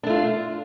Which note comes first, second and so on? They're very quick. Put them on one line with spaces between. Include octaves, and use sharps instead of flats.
D4 A3 F4